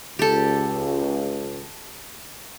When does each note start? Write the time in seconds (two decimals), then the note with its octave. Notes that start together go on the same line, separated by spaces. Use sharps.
0.19 C#2 G4 A4